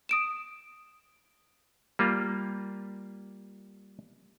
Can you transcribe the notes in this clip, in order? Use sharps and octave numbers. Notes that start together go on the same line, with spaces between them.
D#6 D7 E7
G3 A#3 F4